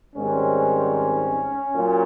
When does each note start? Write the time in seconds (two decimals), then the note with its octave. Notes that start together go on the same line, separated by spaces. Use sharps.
0.14 G#2 D#3 G3 C4 C#4
1.73 A#2 F#3